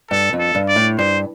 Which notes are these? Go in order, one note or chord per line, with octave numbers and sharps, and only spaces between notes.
G2 A4
F2
A4
G2
D5
A2
G2 C5